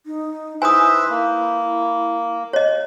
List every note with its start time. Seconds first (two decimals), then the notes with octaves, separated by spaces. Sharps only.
0.06 D#4
0.62 E4 B4 C5 E5 G#5 D#6
1.10 A#3
2.53 C#5 D#5